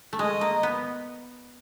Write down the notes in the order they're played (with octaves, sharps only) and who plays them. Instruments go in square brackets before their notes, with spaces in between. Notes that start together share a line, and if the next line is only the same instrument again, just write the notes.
[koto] A3
[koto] G#3 [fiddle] D#5
[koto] A#3
B3